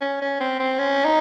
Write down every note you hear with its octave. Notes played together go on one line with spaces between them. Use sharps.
C#4
C#4
C4
C4
C#4
D#4